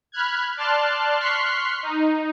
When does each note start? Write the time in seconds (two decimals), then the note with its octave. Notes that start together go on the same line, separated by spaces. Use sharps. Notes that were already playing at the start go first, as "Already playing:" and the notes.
0.12 B5 F6 F#6 G#6
0.57 D5 A5 C6 F6 F#6
1.20 C6 C#6 F6 F#6 B6 C7
1.83 D#4